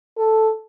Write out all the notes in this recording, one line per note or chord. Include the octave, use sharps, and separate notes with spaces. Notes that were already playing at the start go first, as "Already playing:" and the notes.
A4